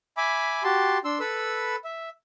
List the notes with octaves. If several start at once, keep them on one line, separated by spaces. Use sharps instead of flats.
E5 G#5 B5 D6
F#4 G4 A5 C6
D4 C6 E6
A4 B4 B5 E6
E5